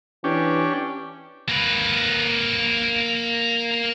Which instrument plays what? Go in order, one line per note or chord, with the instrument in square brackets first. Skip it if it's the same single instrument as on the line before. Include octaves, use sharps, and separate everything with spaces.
[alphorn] E3 [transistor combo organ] C#4 D4 G4
[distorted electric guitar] A#3 B4